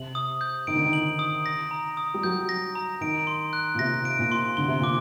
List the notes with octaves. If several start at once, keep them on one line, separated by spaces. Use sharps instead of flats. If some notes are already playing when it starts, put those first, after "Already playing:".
Already playing: C3 F#7
D#6
G6
D#3 D7
D3
D#3
F#7
D#6
A#6
A#5
D#6
G3
F#3 G6
A#6
A#5
D#3 D7
C6
F#6
A#2
C3 A#6
D7
A#2
C6
D3 G7
C3
A#2 D6